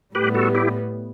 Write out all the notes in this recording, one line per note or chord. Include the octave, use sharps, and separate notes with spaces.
A2 G3 B3 G4 B4
F#4 A4
E4 G4